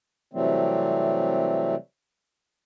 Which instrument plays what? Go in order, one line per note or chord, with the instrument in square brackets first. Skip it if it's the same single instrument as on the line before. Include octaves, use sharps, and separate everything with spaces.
[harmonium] C3 E3 F#3 G3 A3 C4